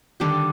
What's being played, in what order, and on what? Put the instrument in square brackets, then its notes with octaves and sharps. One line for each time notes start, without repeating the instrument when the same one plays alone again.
[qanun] D3 G3 D4 G4 [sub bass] D#3